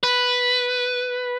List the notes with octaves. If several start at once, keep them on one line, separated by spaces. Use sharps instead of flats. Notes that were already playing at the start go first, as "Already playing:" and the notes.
B4